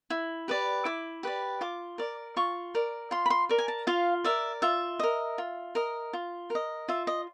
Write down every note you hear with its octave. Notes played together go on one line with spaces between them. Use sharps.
E4
G4 B4 D5
E4 D6
G4 B4 D5
F4 D6
A#4 D5
F4 C#6
A#4 D5
F4 C6
B5
C6
A#4 D5
G#5
A5
F4 F5
A#4 D5 E5
F4 E5
A#4 D#5
F4
A#4 D#5
F4
A#4 D#5
F4 E5
D#5